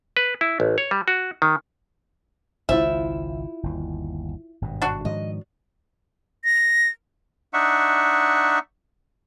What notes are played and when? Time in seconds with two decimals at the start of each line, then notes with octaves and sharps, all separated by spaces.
0.17 B4
0.41 E4
0.60 A1
0.78 C#5
0.91 G3
1.08 F#4
1.42 D#3
2.69 G#1 C#2 G#2 E4 F4 C5 E5
3.63 G1 D#2
4.62 G#1 G2 B2
4.82 D4 F#4
5.05 G#2 D#3 F3 D#5
6.44 A#6
7.53 D4 D#4 E5 F#5 C#6